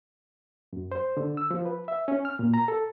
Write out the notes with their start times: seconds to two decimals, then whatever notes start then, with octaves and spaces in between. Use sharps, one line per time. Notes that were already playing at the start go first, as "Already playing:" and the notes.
0.73 F#2
0.92 C5
1.17 D3
1.37 E6
1.51 F3
1.65 B4
1.88 E5
2.08 C#4
2.25 F6
2.39 A#2
2.54 A#5
2.68 A4